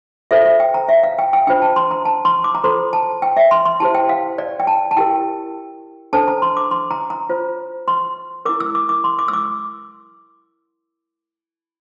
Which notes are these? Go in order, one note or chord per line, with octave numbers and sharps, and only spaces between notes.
F4 A4 C5 E5
E5
G5
A#5
E5
F5
G5
G5
D4 F4 C5 G5
A5
C6
A#5
A5
C6
D6
A#5
F4 A4 C5 C6
A5
G5
E5
C6
C6
E4 G4 C5 A5
G5
F5
D5
G5
A5
A5
E4 G4 A#4 G5
D4 A4 C5 A5
A#5
C6
D6
C6
A#5
A#5
F4 C5
C6
E4 A#4 D6
E6
D6
D6
C6
D6
E6
D6